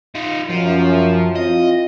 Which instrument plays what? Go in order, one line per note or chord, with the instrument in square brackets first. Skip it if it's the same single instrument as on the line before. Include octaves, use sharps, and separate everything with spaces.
[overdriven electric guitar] D#4 F4
[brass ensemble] F#2 [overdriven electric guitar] F3
[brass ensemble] C4 E4 F4 [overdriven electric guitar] D#5